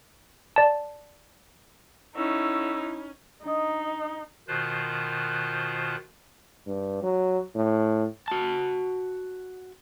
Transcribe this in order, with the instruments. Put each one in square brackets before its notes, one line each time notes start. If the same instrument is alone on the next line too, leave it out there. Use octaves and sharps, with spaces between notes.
[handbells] D5 A5
[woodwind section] D3 C#6 E6 [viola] C#4 [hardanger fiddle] D#4 [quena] E4
[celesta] D4 D#5 D#6 [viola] D#4
[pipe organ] B2 D#3 F4 C5 F#6 G6
[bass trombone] G2
F#3
A2
[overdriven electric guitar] F#4 A5